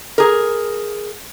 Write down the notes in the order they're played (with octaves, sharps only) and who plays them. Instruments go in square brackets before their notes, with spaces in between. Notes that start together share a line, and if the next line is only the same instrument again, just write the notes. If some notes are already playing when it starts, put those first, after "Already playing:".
[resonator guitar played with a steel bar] G#4 A#4